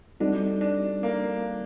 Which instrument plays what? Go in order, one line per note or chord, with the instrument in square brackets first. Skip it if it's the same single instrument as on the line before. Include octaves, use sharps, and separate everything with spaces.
[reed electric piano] G3 C4 D#4 F#4 A4 [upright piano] D4
[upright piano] D4
A#3